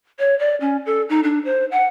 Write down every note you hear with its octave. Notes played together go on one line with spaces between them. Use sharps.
C#5
D5
C#4
A4
D#4
D4
C5
F#5